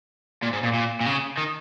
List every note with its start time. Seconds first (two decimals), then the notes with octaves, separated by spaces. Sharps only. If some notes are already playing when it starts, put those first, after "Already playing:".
0.42 A#2
0.53 G#2
0.63 A#2
0.74 A#2
1.01 A#2
1.06 C#3
1.37 D#3